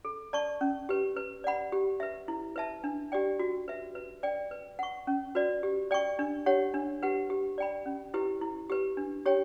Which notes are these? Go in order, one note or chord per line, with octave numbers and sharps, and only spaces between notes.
A4
D5 A5 C#6
C#4
G4 B4
B4
D5 F#5 B5
G4
B4 E5
E4
B4 E5 A5
D4
G4 D5 G5
F#4
B4 E5
B4
D5 G5
B4
F#5 C#6
C#4
F#4 B4 D5
G4
D5 G5 C#6
D4
G4 C#5 F#5
D4
G4 B4 F#5
G4
D5 G5 B5
C#4
E4 G4 B4
E4
G4 B4
D4
G4 C#5 G5